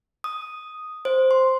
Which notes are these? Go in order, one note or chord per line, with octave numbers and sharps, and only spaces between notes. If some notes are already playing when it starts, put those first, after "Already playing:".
D#6
C5
C6